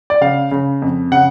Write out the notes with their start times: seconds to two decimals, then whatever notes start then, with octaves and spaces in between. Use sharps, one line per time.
0.10 D5
0.21 C#3 F5
0.51 C#3
0.82 F2
1.12 C#3 F#5